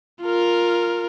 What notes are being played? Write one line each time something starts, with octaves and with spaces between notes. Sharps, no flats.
F4 A#4